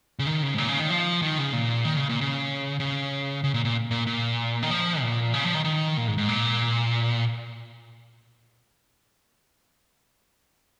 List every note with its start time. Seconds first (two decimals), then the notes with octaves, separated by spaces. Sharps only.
0.19 C#3
0.27 D#3
0.42 C#3
0.54 G#2
0.58 A#2
0.68 C#3
0.79 D#3
0.90 F3
1.22 D#3
1.38 C#3
1.53 A#2
1.85 D#3
1.96 C#3
2.09 A#2
2.21 C#3
2.80 C#3
3.44 C#3
3.54 A#2
3.65 A#2
3.91 A#2
4.07 A#2
4.63 D#3
4.70 F3
5.01 A#2
5.34 C#3
5.45 F3
5.54 D#3
5.65 D#3
5.97 A#2
6.08 G#2
6.18 G#2
6.29 A#2